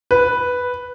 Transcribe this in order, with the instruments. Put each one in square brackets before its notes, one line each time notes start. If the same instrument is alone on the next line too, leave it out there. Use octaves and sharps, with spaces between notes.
[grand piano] B4